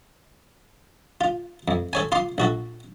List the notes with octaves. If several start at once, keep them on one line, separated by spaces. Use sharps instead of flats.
F4
F2
A4 C#5 G#5
F4 C6 D6
A#1 F#4 A4